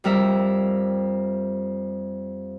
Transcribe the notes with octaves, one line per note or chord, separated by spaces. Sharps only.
F2 G3 A#4 E5